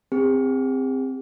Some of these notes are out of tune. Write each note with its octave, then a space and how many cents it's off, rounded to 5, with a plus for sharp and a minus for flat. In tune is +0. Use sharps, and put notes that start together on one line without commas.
C4 +0 G#4 -45